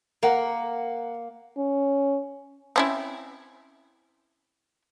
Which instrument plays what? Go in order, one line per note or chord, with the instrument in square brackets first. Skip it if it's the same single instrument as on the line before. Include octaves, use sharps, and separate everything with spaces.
[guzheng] A#3 [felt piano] A#4 F#5
[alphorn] C#4
[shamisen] C4 C#4 E4